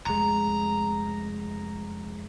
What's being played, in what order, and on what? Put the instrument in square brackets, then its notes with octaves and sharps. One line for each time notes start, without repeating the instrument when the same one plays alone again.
[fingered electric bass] F1 G#3 [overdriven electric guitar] A#5